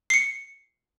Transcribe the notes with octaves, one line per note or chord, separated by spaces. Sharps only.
C7 C#7